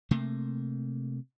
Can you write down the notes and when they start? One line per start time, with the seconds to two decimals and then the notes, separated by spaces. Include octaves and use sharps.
0.11 C3 A3 A#3